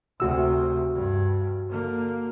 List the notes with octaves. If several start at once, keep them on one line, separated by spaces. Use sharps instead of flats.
D2 C3 F#4 E6
G2
D3 A#3